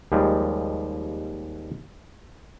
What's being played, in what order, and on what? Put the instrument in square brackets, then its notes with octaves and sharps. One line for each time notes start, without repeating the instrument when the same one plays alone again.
[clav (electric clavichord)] D#2 F3 G3 G#3